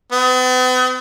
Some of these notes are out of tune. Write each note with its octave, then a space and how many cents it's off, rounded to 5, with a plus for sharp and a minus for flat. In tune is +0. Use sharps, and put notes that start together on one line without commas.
B3 +45